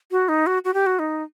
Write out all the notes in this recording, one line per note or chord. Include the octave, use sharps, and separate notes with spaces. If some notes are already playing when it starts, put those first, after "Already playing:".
F#4
D#4
F#4
F#4
G4
F#4
D#4